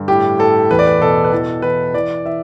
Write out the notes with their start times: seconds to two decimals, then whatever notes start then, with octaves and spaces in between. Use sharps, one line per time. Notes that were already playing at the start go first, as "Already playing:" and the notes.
Already playing: G2 D3
0.08 A2 G4
0.39 A2 A4
0.70 E2 B4
0.79 D5
0.87 B4
1.01 B2 A4
1.24 B4
1.32 E3 A4
1.62 E3 B4
1.94 E3 D5
2.25 E3 E5